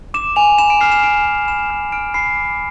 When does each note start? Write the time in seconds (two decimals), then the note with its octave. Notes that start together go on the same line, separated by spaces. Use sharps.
0.14 D6 E7
0.36 G#5 F7
0.58 B5 E7
0.70 D7
0.81 F6 C7
0.92 E7
1.03 D6 D7
1.26 G#5
1.48 B5 E7
1.70 F6
1.92 F6 D7
2.14 B5 C7
2.37 D6